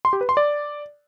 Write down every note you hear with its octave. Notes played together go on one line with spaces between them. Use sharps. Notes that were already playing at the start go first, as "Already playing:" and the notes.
C6
G4
B4
C6
D5